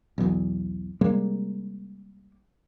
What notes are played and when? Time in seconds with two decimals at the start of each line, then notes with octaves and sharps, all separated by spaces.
0.18 B1 E2
1.01 C3 G3 G#3 A#3